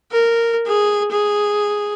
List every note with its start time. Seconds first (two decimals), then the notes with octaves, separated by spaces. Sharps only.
0.12 A#4
0.67 G#4
1.12 G#4